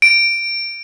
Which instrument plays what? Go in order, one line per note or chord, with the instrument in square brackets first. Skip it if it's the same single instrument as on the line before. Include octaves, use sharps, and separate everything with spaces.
[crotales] D7